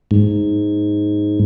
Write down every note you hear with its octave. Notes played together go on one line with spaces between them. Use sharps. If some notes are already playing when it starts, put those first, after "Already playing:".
G#2